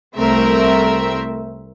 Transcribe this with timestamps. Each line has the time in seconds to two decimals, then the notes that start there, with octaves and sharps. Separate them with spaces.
0.16 C2 A3 C4 A#4 E5